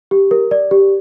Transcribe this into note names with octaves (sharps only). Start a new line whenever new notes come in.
G4
A#4
D5
G4